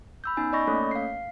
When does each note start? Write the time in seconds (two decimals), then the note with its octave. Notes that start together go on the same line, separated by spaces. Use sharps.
0.24 B5 E6 G6
0.37 B3 C#4 D#4 G#5
0.53 D5 D#5 B5 C#6 A#6
0.67 A3 A#3 C#4 A4 C#5
0.91 F5 C7